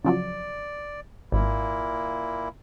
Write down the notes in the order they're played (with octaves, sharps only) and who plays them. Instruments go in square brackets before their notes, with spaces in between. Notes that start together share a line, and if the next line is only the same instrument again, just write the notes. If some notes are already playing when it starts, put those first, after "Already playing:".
[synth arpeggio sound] C#3 F3 F#3 [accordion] D5
[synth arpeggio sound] G#1 [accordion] A#2 A#3 E4